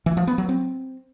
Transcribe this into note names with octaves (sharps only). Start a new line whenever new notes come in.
E3
F3
B3
F#3
C4